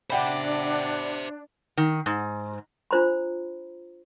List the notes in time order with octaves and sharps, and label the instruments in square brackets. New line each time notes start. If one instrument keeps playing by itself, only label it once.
[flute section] D4 [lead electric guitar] C5 E5 [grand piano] F#5 G5 B5
[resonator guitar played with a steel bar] D#3
G#2
[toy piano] D4 F4 C5 A#5 B5